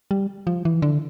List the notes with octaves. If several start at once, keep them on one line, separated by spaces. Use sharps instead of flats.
G3
F3
E3
D3